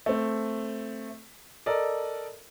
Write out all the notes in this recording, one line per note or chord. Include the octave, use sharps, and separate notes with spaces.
A3 C4
A4 A#4 D5 D#5